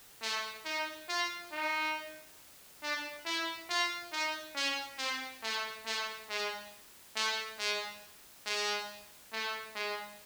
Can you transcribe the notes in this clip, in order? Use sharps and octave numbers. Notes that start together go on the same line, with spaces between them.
A3
D#4
F4
D#4
D4
E4
F4
D#4
C#4
C4
A3
A3
G#3
A3
G#3
G#3
A3
G#3